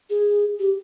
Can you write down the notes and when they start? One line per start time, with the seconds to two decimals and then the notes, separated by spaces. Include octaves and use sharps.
0.10 G#4
0.60 G4